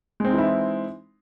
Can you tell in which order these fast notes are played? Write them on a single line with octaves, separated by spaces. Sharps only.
G#3 C4 D#4 E3 E4